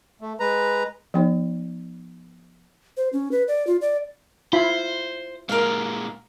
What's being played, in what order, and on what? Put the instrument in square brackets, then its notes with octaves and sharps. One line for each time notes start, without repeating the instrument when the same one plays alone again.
[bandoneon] A3
G#3 B4 A#5
[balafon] F3 B3 D#4 C#5
[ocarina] C5
C#4
B4
D5
F4
D5
[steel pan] E4 F4 B5 [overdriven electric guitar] C5
[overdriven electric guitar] A#2 G#3 [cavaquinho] A#4 F5